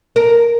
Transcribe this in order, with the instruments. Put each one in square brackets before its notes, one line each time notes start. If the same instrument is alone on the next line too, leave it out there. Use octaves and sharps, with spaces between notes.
[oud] A#4